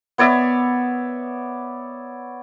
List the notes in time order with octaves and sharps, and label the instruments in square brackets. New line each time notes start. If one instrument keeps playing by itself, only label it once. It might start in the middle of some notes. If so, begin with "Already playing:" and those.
[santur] B3 C#5 D5 E5